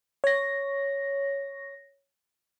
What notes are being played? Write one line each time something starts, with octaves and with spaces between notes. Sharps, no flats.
C#5 A#6